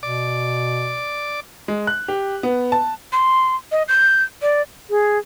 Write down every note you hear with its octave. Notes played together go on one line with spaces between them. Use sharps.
B2 D5 D6
G#3
F#6
G4
B3
A5
C6
D#5
G6
D5
G#4